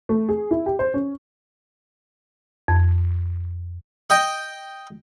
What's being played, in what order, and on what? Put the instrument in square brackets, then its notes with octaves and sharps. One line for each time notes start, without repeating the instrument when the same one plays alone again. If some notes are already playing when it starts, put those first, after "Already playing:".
[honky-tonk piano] A3
G#4
E4
G4
C5
C#4
[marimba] F2
[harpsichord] D#5 G5